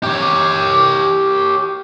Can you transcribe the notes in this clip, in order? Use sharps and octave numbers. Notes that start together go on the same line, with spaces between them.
G4 C#5